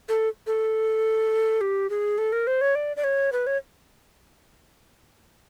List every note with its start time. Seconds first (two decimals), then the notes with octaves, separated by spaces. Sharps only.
0.09 A4
0.47 A4
1.61 G4
1.90 G#4
2.18 A4
2.32 A#4
2.47 C5
2.61 C#5
2.75 D5
2.96 D5
3.04 C#5
3.32 B4
3.47 C#5